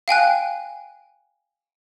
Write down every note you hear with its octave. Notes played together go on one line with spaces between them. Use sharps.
F5 G5 G#5 F#6